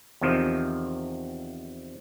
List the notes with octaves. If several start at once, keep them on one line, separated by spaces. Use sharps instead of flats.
E2 C3 D#3 F3